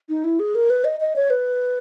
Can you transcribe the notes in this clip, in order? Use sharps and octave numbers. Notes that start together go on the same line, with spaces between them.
D#4
E4
G#4
A#4
B4
D#5
D#5
C#5
B4